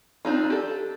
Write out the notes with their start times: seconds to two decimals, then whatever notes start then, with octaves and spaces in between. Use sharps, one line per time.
0.25 C4 D4 D#4 F4
0.50 G4 A4